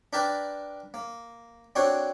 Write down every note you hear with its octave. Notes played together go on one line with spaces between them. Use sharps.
D4 A#4 B4 D5 G5 A5
A#3
C4 D4 F#4 C5 C#5